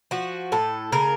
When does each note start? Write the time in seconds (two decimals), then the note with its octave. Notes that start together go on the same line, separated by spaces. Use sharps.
0.11 F3 F#4
0.52 A2 A4
0.92 C#3 A#4